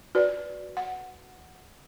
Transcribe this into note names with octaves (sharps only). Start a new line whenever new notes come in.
F#4 B4 D5
F#5